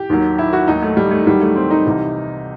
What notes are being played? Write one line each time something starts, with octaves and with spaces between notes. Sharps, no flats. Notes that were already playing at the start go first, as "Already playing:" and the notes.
Already playing: G4
D#2 D#3 F#3
E4
F#4
D#2 D#3 F#3 D#4
A3
G3
A3
D#2 D#3 F#3 G3
A3
C4
D#4
C2 C3 E3